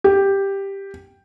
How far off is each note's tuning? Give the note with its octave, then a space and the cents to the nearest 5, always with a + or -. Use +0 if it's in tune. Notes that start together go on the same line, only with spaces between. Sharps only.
G4 +5